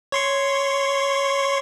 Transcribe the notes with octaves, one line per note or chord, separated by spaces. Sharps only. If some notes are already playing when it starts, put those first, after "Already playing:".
C#5 C6 C#6